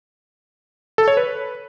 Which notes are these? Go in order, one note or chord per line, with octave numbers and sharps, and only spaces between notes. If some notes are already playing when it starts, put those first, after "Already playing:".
A4
C#5
B4